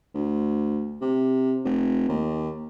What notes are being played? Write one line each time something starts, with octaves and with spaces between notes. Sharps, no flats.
D2
C3
F1
D#2